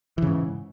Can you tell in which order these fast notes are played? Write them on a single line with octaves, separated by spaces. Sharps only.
E3 C#3 G#2